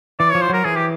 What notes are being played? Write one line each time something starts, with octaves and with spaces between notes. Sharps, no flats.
E3 D5
F3 C#5
C5
F#3 A#4
E3 G#4
G4